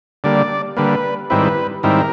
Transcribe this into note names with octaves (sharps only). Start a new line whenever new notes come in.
D3 G3 A#3 D5
D3 G3 A#3 B4
G#2 D#3 G3 C4 E4 B4
G#2 D#3 G3 C4 E4 A#4